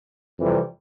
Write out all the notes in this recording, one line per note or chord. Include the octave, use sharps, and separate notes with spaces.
F2 C3 E3 G3